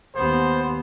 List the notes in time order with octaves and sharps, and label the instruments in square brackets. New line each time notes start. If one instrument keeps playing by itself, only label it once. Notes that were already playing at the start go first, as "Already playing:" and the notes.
[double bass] D#2 B3 [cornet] C5